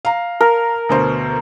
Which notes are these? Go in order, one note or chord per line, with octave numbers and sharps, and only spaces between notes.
F5 A#5
A#4
D2 B2 C5